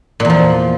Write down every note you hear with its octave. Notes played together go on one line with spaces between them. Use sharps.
E2 A#2 F3